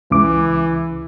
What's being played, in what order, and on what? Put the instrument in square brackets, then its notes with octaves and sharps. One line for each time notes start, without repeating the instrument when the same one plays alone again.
[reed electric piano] C#2 C#3 D6 [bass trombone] E3